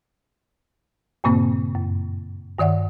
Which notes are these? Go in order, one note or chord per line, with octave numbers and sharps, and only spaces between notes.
G2 A#2 C#3 A#3 C4
F#2
G2 D#3 D5 E5 F#5